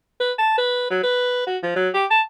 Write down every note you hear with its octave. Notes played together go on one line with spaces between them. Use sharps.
B4
A5
B4
F#3
B4
F#4
F3
F#3
G4
A5